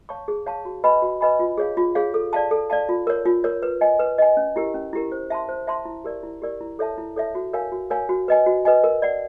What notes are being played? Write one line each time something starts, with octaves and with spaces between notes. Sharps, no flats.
C#5 F5 A5 C#6
G#4
C#5 F5 A5 C#6
F#4
B4 D#5 G#5 B5
F#4
B4 D#5 G#5 B5
F4
G#4 C#5 F5
F4
G#4 C#5 F5
A4
D5 F5 A5
A4
D5 F5 A5
F4
A#4 C#5
F4
A#4 C#5
B4
D#5 G#5
B4
D#5 G#5
C#4
E4 G4 A#4
C#4
E4 G4 A#4
C5
E5 A5 C6
C5
E5 A5 C6
E4
G4 A#4 D5
E4
G4 A#4 D5
E4
A4 C#5 E5 A5
E4
A4 C#5 E5 A5
F#4
A#4 C#5 F5 G#5
F#4
A#4 C#5 F5 G#5
F#4
B4 D#5 G#5
F#4
B4 D#5 G#5
A#4
D5 F#5